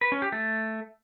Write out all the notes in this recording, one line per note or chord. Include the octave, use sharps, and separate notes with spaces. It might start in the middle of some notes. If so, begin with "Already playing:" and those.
B4
C#4
G4
A3